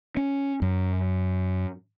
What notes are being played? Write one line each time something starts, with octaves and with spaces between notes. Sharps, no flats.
C#4
F#2